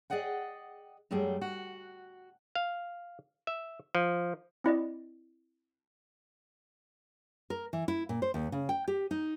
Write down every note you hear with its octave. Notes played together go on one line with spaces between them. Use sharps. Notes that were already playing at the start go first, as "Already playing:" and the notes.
G#4 D5 D#5 F#5 G5
F#2 F#3 G3 A3 G#4 G5
F#4
F5
E5
F3
C4 E4 D5 D#5
A#4
E3
E4
A#2
C5
D#2
C#3
G5
G4
D#4